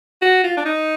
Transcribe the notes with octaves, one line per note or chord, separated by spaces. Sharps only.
F#4
F4
D4
D#4